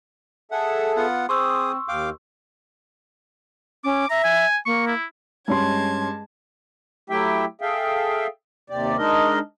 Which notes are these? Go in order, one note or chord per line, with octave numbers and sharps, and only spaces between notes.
G#4 A4 E5 F#5
B3 F4 F#5
C4 G#4 C5 C6 C#6 D#6 E6
D#2 F5 G5 D6
C#4 D6
E5 A#5
G#5
A#3 C#6
E4
G2 G#3 C#4 A5 C6 G#6
F#3 A3 E4 G4 E5 G5
G#4 A4 E5 F5 G5
D#2 C3 G4 D5
G#3 D4 D#4 A#4 D#5